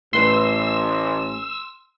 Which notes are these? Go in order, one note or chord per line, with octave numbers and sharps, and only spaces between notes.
A1 A2 B4 C5 C6 E6